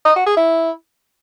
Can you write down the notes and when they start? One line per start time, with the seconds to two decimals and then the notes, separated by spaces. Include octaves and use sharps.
0.05 D#5
0.16 F#4
0.26 G#4
0.37 E4